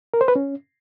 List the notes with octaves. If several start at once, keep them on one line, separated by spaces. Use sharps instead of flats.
A#4
C5
B4
C#4